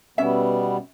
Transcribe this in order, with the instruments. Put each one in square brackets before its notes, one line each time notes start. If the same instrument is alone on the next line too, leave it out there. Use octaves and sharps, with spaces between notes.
[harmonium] B2 G3 B3 [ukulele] C#4 E5